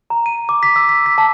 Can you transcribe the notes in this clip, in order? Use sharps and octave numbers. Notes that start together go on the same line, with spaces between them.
A#5
D#7
D6
B6
E6
B6
B6
A5